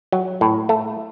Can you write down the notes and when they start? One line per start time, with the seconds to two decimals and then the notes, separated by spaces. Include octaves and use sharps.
0.12 F#3
0.41 A2
0.69 A3